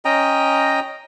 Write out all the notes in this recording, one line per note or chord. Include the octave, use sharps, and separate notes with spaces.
C#4 D#5 G5 A#5